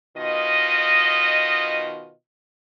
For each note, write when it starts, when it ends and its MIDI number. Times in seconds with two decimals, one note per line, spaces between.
0.17 2.11 47
0.17 2.11 51
0.17 2.11 65
0.17 2.11 75